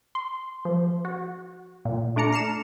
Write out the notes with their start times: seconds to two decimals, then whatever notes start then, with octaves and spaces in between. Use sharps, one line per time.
0.15 C6
0.65 F3
1.05 F#4
1.85 A#2
2.16 A3 D4 D5 A#5 C#7
2.32 F6 C7 C#7 E7